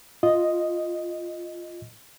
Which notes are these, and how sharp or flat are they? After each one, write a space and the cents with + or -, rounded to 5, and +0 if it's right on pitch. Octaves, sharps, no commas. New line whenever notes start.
F4 +0 D#5 +0